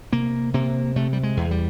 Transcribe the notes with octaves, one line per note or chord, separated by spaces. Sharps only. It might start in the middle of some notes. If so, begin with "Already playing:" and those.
C3 A#3
C3 A#3
C3 A3
G3
G#3
E2
G3